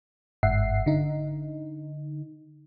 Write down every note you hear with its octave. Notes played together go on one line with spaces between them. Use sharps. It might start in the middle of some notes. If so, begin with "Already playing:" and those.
G1 G#2 E5 F#5 C7
D3 D#4